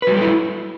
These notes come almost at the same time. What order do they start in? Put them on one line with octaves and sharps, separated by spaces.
B4 F#3 G3 A4 E4